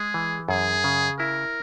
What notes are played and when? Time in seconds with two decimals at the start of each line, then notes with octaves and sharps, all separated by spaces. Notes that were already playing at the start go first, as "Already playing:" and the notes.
Already playing: G#3 G#4
0.14 E3
0.49 F#2 G#4
0.84 C#3
1.19 E4 A#4